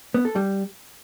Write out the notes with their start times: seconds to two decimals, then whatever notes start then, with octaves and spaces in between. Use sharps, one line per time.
0.14 B3
0.25 A4
0.35 G3